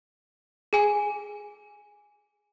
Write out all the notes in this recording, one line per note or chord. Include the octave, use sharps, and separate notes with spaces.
G#4 G#5